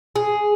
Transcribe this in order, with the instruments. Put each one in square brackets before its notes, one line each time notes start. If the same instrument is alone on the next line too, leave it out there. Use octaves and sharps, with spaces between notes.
[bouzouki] G#4